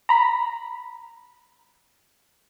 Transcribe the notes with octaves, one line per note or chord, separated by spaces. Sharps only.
A#5 B5